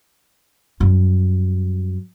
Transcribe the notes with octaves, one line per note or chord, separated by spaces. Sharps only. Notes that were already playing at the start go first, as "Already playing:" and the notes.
F#2 G3